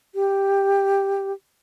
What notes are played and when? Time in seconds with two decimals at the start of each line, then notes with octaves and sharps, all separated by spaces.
0.15 G4